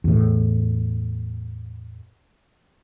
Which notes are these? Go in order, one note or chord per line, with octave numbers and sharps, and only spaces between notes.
E2 A2